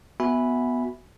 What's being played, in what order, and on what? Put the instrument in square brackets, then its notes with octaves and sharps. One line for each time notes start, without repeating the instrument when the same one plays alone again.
[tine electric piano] B3 F#4 E5 G#5 B5